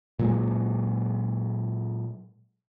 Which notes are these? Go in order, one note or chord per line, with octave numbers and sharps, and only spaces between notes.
A#2 F#3 G#3